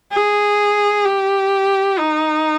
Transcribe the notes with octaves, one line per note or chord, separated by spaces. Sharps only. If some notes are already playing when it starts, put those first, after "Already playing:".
G#4
G4
D#4